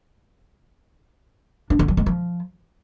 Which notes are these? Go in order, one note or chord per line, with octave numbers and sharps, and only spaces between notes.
D4
D3
F#3
G#3
F3